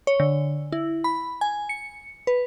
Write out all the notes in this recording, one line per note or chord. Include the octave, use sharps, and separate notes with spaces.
C#5
D3
E4
B5
G#5
C#7
B4